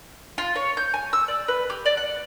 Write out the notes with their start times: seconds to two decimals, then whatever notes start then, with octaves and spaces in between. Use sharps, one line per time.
0.38 F4
0.56 C#5
0.77 G6
0.94 G#5
1.13 E6
1.28 D5
1.48 B4
1.70 G4
1.86 D5
1.97 F#5